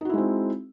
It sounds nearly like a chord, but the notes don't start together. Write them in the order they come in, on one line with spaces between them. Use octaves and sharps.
D#4 F#4 E4 G#3 C4